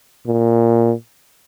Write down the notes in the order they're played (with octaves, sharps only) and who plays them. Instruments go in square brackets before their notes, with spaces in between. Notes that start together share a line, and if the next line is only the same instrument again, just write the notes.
[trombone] A#2